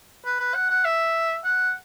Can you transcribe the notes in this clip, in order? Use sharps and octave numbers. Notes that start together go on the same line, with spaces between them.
B4
B4
F#5
F#5
E5
F#5